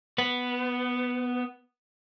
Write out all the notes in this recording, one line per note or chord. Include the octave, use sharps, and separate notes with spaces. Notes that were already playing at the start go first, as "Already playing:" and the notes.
B3 B4